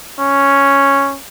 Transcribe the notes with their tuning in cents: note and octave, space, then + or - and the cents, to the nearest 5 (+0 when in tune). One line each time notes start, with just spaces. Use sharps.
C#4 +0